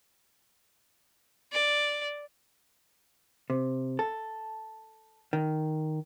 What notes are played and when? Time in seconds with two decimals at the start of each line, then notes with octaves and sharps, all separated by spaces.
1.52 D5
3.50 C3
3.99 A4
5.33 D#3